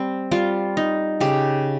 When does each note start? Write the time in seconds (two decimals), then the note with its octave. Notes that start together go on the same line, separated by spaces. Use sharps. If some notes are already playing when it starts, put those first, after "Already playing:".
Already playing: G3 C4
0.31 G3 F4
0.77 D#4
1.20 C#3 G4